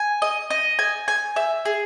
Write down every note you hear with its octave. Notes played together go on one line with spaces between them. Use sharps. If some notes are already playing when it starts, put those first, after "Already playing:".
Already playing: G#5
D#5
D#5
G#5
G#5
E5
G#4